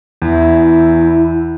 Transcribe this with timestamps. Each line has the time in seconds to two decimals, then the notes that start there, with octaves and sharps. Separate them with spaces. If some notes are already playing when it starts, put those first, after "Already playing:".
0.22 E2 E4